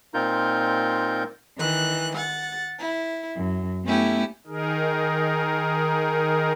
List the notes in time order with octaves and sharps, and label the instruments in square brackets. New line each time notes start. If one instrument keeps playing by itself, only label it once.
[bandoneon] A#2 C4 D#4 F4 A#4 G6
[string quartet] D#3 E3 F#6
F#5 A6
E4
F#2
A3 B3 C#4 E4 G4
[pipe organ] D#3 D#4 G#4 A#4